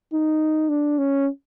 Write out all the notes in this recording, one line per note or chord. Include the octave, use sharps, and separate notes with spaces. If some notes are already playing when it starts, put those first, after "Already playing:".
D#4
D4
C#4